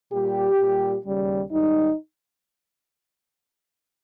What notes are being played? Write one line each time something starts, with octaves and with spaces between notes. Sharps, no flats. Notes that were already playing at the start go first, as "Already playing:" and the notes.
A#2 G3 G4
A#2 G3
D#2 C#3 G3
G#2 D#3 G3 D#4